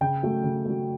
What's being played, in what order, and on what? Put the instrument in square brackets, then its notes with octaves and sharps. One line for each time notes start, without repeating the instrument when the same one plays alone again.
[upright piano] C#3 G5
F#3 A3
C#3
F#3 A3